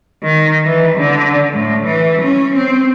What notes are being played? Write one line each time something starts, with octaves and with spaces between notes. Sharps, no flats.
D#3
E3
D3
A2
E3
C#4
C4